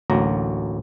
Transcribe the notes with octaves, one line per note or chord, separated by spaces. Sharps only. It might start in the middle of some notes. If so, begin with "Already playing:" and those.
A1 D2 F#3 A#3 A#5